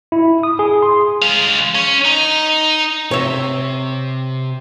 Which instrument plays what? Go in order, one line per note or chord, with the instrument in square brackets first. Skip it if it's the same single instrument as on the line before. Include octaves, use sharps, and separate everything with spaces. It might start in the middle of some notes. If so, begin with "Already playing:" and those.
[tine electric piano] E4
D#6
G#4
C6
[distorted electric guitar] G#3 F5
C#4
D#4
[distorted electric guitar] C3 [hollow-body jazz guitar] C#5 E5